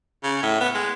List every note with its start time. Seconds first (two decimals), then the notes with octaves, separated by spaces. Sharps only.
0.23 C#3
0.43 A2
0.60 B3
0.75 G#3